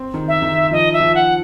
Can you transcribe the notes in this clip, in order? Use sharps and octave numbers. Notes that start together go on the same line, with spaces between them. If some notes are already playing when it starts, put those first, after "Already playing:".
Already playing: C4
D#3
E5
D#3
F3 D#5
E5
F3
F#5